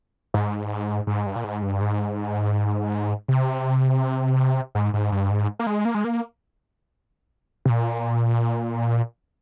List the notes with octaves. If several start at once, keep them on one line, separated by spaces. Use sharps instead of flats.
G#2
G#2
G2
A#2
G#2
G2
G#2
C3
G#2
G#2
G2
G#2
A#3
G#3
A#3
G#3
A#3
C3
A#2